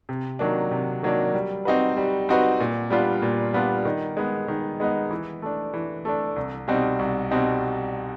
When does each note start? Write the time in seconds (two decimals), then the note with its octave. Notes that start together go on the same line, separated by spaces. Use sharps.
0.09 C3
0.39 D#3 F#3 A#3 D4
0.71 C3
1.03 D#3 F#3 A#3 D4
1.34 G3
1.65 C4 D#4 F#4 B4
1.97 G3
2.29 C4 D#4 F#4 B4
2.60 A#2
2.90 G3 B3 D4 F4
3.22 A#2
3.53 G3 B3 D4 F4
3.85 D#3
4.17 G#3 B3 D#4
4.48 D#3
4.80 G#3 B3 D#4
5.10 E3
5.42 A3 D4
5.74 E3
6.05 A3 D4
6.36 C2
6.68 B2 G3 C4 D#4
6.99 C2
7.31 B2 G3 C4 D#4